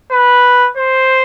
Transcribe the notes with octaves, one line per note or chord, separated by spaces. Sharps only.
B4
C5